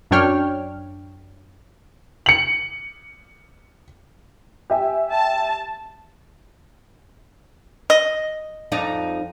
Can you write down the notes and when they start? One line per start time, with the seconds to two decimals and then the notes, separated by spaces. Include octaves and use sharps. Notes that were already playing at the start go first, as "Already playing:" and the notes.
0.11 F#2 F#3 D4 C#5 G5 F6
2.26 C#7 F#7
4.70 G4 E5 G#5
5.13 A5
7.90 D#5
8.72 F2 D#4 D5